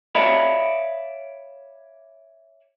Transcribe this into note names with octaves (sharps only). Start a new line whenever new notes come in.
C#5 D5 E5 F5 B5